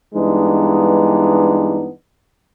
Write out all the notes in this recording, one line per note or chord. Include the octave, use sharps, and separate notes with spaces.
G2 E3 G#3 B3 D4 D#4